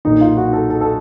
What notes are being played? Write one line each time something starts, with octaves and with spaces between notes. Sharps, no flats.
B1 A#2 F#3 D#4
F4
F#4
A4
A4
A4